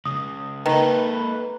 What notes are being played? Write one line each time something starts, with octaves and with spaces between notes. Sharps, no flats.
C#2 C#3 D#6
D#3 A#3 A4 B4 A#5